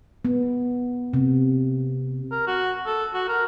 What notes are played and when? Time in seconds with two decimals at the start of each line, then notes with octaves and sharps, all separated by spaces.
0.25 B3
1.13 C3
2.31 A#4
2.47 F#4
2.86 A4
3.14 F#4
3.29 A#4